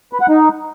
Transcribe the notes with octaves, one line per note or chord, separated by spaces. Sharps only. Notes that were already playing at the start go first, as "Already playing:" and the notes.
B4
F#5
D#4